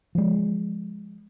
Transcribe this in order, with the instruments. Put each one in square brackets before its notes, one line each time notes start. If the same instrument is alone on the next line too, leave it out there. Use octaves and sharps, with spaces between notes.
[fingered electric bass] F3 G#3